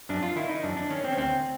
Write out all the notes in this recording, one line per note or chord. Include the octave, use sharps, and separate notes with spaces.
F#2 D4
F4
D#3 E4
D#4
F#2 D4
D4
D#3 C#4
C4
C#4
D2 C4